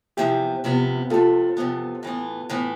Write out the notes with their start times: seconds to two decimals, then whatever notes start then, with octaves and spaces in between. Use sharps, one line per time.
0.17 E2 C3 F3 B3 E4 G4
0.64 E2 C3 F3 B3
1.10 E2 C3 F3 B3 F4 A4
1.57 E2 C3 F3 B3
2.03 A2 E3 B3
2.50 A2 E3 B3